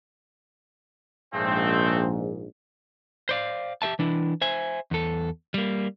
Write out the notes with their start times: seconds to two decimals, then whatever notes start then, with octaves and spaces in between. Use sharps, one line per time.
1.33 A#1 G#2 C#3 A3 C4
3.29 C5 D5 F5
3.82 G4 G#4 E5 A5
3.99 E3 D4 E4
4.42 C5 E5 G#5
4.91 E2 A4
5.54 G3 A#3